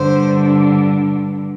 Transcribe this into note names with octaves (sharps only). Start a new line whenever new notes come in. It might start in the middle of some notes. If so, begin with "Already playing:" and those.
Already playing: G2 D3 C5